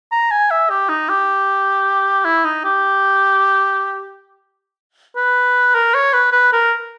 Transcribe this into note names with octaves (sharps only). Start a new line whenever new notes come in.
A#5
G#5
E5
G4
D#4
G4
E4
D#4
G4
B4
A#4
C#5
B4
B4
A#4